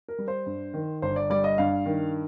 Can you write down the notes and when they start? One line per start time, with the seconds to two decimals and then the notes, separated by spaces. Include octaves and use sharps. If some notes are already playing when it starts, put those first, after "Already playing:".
0.08 A#4
0.18 G3
0.28 C5
0.46 G2
0.74 D#3
1.02 G1 C5
1.16 D5
1.30 G3 D5
1.44 D#5
1.58 G2 F5
1.86 D#3